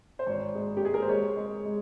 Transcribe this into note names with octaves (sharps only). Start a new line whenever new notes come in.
C5
G#1 C#5
G#3
G4
G#3 G#4
A#4
C5
G#3 C#5
G#3
G#3